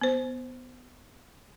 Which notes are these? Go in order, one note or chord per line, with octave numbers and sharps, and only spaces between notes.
B3 C5